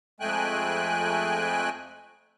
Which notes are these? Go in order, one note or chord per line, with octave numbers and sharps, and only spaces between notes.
F2 G#3 A3 G5 G#5 F#6